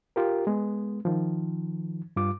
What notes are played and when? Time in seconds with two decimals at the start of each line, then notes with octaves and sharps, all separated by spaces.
0.16 F4 G4 A#4
0.47 G#3 B3
1.05 D#3 F3
2.16 G2 G3 F4 D6